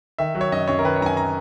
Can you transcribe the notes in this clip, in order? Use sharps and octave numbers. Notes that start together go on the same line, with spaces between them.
D#3 E5
F#3
C#5
F#2 D#5
F#2 C#5
A#4
D#3 B4
C#5
F#2 A#5
G#5
A#5